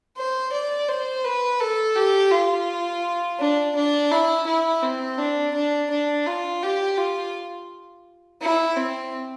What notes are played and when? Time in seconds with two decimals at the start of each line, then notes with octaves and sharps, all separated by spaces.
0.17 C5
0.52 D5
0.89 C5
1.24 B4
1.60 A4
1.96 G4
2.31 F4
3.39 D4
3.75 D4
4.11 E4
4.46 E4
4.83 C4
5.18 D4
5.54 D4
5.90 D4
6.26 F4
6.63 G4
6.97 F4
8.42 E4
8.77 C4